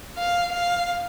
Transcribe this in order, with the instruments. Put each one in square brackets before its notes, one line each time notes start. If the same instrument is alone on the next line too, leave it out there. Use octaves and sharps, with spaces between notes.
[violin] F5
F5